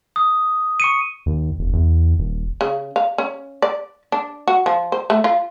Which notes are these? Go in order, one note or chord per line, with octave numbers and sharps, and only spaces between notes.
D#6
C#6 C#7 D#7
D#2
E1
E2
D#1
C#3
F5
C#4
D5
D4
F#4
F3
C5
A3
F4